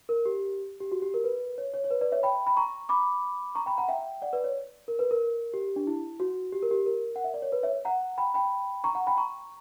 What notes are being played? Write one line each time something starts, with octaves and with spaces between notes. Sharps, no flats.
A#4
G4
G4
F#4
G4
A#4
B4
C#5
C#5
C#5
B4
B4 D5
C#5 E5
G5 B5
B5
A#5 C#6
B5 D6
A#5 C#6
G5 B5
F#5 A#5
E5 G5
D5 F#5
B4 D5
C#5
A#4
B4
A#4
G4
D4
E4
F#4
G4
A#4
G4
A#4
F#5
E5
D5
C#5
B4
C#5 E5
F#5 A#5
G5 B5
G5 B5
A#5 C#6
F#5 A#5
G5 B5
A#5 C#6